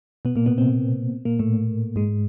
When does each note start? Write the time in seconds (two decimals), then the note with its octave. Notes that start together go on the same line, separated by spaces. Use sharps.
0.25 B2 B3
0.36 A#2 A#3
0.46 B2 B3
0.58 C3 C4
1.25 A#2 A#3
1.39 A2 A3
1.96 G#2 G#3